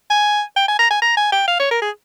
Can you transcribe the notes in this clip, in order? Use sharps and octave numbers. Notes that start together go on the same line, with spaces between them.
G#5
G5
G#5
A#5
G#5
A#5
G#5
G5
F5
C#5
A#4
G#4